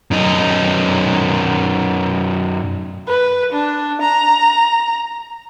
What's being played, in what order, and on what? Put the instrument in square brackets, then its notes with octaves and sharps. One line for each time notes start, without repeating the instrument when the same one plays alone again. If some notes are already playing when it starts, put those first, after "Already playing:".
[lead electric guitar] F#2 D#4
[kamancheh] B4
D4
A#5